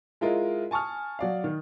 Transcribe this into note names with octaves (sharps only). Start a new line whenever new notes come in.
G#3 E4 F4 A#4 D#5
G#5 A5 C#6 D#6 F6
F#3 D5 F5
D#3